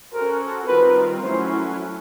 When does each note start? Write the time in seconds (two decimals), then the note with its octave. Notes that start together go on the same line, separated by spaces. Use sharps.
0.13 C#4 F#4 A4 A#4 C5
0.68 D#3 G3 C4 F4 A#4 B4
1.23 F#3 A3 C#4 E4 C5